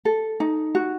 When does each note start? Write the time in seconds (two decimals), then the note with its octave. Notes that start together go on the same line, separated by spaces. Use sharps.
0.05 A4
0.40 D#4
0.75 F#4